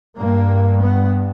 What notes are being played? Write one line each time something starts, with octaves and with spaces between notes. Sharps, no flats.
G2 A#3
B3